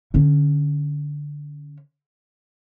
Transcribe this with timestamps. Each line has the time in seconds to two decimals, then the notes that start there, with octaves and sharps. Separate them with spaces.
0.14 D3 C#4